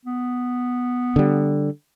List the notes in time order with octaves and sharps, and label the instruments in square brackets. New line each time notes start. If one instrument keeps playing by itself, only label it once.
[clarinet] B3
[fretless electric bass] D3 G3